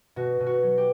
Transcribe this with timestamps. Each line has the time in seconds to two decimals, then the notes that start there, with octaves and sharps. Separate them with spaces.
0.16 B2 F#4
0.40 B2
0.46 F#4
0.63 F#3
0.78 G4